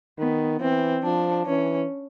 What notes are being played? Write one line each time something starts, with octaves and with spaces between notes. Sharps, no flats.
D#3 B3
E3 C4
F3 D4
E3 C#4